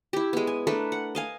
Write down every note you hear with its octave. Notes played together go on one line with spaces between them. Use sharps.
E4 G4
G#3 B3
G#5
A3 D4 A#4 B4
F#5
D#5 F5 G#5